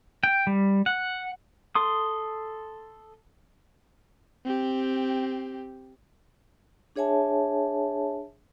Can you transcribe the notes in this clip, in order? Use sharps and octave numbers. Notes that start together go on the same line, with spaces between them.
G5
G3
F#5
A4 C6 D#6
C4 G4
D4 G#4 C#5 E5 G#5 A5